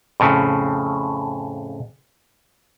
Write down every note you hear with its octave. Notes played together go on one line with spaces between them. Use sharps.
F2 A2 C#3